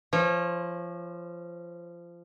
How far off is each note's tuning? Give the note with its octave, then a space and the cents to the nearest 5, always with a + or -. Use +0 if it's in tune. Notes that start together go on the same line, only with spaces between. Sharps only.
F3 -20 C#5 -30